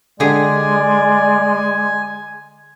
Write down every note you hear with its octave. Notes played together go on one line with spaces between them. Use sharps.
D3 G#3 G4 G#4 D5 G#5